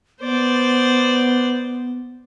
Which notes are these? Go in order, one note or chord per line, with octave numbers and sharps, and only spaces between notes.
B3 C5 D5